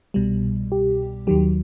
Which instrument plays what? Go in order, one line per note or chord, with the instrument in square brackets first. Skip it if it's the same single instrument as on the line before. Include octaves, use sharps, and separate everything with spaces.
[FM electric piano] C2 B2 G3
G4
D#2 D#3 F#3 G4